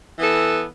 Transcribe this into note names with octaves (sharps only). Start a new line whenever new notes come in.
E3 B3 A4